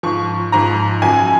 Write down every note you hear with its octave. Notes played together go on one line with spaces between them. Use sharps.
G#2 F3 C#6
G#2 F3 A#5
F#2 F3 G#5